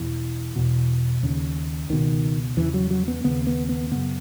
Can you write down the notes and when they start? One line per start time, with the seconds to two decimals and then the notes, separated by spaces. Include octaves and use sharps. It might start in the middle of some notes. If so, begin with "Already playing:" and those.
Already playing: E2 B2 E3
0.56 E2 B2
1.23 D#2 C#3
1.89 C#2 B2 D#3
2.57 E2 C#3 E3
2.74 F#3
2.91 F#3
3.08 B3
3.24 D#2 C#3 B3
3.47 B3
3.69 B3
3.92 F#2 C#3 B3